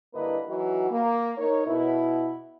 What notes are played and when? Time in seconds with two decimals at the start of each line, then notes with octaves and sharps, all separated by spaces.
0.14 G2 D3 A#3 E4 B4 D#5
0.48 E3 F#3 D#4 F#4
0.91 A#3
1.38 D#4 A#4 C#5
1.67 B2 E4